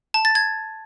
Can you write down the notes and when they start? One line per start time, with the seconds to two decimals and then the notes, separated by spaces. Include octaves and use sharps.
0.14 A5
0.25 A6
0.35 G#6